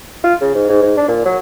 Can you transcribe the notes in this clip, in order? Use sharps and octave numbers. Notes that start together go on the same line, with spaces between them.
F4
C#3
G#2
G#2
G#2
D4
A#2
F#3